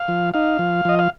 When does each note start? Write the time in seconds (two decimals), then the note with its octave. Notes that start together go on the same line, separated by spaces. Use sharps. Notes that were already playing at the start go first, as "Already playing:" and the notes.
Already playing: F5
0.08 F3
0.34 D#4 F5
0.59 F3
0.85 F3 D#5
0.99 F5